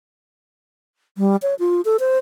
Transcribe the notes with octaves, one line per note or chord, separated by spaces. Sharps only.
G3
C#5
F4
A4
C5